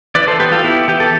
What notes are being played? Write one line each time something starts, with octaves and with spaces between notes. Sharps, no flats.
E3 B4 D5
A4 C5
B3 G4 B4
F4 A4
B3 E4 G4
E3 G4
A4